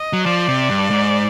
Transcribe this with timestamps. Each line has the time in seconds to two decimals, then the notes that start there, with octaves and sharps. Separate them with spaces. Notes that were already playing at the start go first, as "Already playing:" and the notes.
Already playing: D#5
0.13 F#3
0.25 F3 D5
0.48 C3
0.70 G2
0.91 G#2